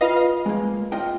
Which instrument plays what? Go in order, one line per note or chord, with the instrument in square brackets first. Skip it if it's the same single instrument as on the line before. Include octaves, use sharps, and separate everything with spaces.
[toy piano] F4 B4 [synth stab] D#5 F5
[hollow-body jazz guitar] G#3 A#3
F4 D#5 G5